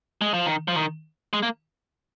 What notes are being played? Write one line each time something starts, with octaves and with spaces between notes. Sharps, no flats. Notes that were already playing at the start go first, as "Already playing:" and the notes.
G#3
F3
D#3
F3
D#3
G#3
A#3